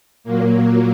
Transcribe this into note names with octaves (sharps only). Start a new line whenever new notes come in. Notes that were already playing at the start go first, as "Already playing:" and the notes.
A#2 F#3 A#3